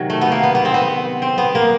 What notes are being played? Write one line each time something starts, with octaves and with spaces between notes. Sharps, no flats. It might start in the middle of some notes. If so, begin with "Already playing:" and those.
Already playing: C3 D#3 F#3
A3
B3
A#3
B3
B3
C4
B3
C4
B3
A#3